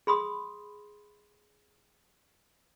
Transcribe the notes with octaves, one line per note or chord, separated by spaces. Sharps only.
G#4 B5 C6 D#6